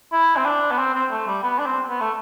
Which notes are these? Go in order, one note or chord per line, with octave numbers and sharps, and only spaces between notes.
E4
C4
D4
B3
C4
C4
A3
G3
B3
D4
C4
B3
A3